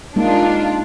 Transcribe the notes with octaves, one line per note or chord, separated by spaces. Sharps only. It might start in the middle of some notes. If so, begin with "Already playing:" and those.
G#3 A#3 D4 D#4 F4